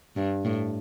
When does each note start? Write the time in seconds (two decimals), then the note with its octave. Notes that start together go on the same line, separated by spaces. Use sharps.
0.16 G2
0.45 A2